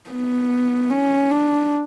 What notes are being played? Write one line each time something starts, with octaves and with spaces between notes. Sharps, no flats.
B3
C#4
D4